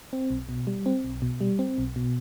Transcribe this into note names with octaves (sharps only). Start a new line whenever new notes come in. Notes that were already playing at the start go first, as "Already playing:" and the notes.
C4
B1
B2
G3
C4
B1
B2
G3
C4
B1
B2